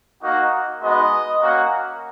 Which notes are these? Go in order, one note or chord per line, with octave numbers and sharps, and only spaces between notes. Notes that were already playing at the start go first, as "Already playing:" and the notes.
A#3 D#4 F#4
G#3 B3 D#4 F#4 D#5
A#3 C#4 F#4